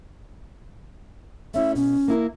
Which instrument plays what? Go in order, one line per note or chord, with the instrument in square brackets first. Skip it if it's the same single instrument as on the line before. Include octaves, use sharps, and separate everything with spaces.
[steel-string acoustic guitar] A3 C#4 E4 [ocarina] E5
[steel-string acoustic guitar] B2 [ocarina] C#4
[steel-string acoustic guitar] A#3 E4 A#4